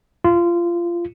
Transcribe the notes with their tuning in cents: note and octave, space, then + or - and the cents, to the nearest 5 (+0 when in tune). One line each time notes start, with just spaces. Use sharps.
F4 -20